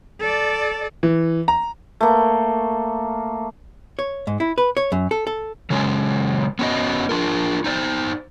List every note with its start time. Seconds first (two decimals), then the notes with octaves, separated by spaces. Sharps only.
0.20 A4 D5
1.03 E3
1.48 A#5
2.01 A3 A#3
3.99 C#5
4.27 G#2
4.40 E4
4.58 B4
4.77 C#5
4.92 F#2
5.11 A4
5.27 A4
5.70 C#3 F#3 G#3 C#4
6.59 B3 C#4 F#4 D#5
7.09 D4 F4 A#4
7.64 D#4 C5 D5